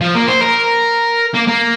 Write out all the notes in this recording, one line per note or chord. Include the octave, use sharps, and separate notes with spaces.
F3
A#3
C5
A#4
A#3
A#3